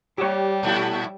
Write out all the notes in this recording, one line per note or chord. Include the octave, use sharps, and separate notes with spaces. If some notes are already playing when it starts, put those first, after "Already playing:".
G3 G4 C#5
A#2 A3 E4